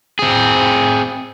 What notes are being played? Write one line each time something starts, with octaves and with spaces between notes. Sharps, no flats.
C4 G#4